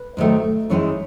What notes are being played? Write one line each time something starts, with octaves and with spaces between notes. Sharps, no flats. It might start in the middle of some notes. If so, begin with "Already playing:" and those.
Already playing: B4
G#2 D#3 F#3 A3
F#2 E3 G#3 D#4 C#5